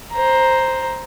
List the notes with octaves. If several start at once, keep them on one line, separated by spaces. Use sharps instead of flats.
C5 A#5